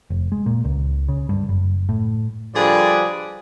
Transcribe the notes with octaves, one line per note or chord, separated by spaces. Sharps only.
F1
G#3
A#2
C#2
C#3
G2
F#1
A2
D3 F3 G3 G#4 B4 D5